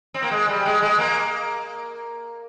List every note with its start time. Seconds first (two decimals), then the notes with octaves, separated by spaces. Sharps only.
0.14 C4
0.22 A#3
0.31 G#3
0.48 G3
0.65 G#3
0.82 G#3
0.99 A#3